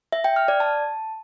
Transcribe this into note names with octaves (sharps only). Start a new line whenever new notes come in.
E5
G5
F6
D5
A5